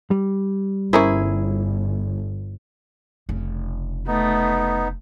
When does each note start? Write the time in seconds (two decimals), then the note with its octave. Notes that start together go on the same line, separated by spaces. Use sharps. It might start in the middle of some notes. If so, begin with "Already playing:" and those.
0.11 G3
0.93 G1 C#4 E4 G#4 A#4 C5
3.29 F1 C#3
4.07 A3 B3 D#4